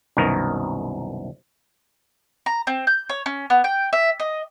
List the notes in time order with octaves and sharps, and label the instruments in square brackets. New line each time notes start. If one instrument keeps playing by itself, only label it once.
[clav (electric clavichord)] C2 F#2 B2 D#3 A#4
[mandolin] A#5
C4
G6
C#5
C#4
B3
G5
E5
D#5